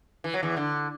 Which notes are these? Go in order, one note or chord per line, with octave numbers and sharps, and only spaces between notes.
E3
F#3
E2 E3
D3